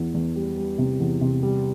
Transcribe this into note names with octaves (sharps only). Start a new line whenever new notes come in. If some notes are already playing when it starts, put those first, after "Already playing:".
Already playing: E2 B3
E2
G3
G3
C3
E2
C3
G3